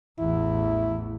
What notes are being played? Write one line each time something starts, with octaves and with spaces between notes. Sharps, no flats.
A1 E2 E4